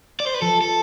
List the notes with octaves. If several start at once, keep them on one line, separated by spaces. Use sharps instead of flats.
D5
C5
B4
F3 A4
A4